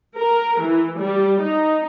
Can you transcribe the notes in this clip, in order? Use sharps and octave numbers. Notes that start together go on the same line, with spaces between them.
A#4
E3
G3
D#4